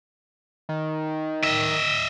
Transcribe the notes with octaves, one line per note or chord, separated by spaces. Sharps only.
D#3
D#5 E5